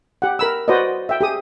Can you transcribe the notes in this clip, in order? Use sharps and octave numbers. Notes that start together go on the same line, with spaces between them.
G4 F#5
A#4 B5 E6
F#4 B4 C5 D5 D#5
E5 G5
G4 G#4 D#6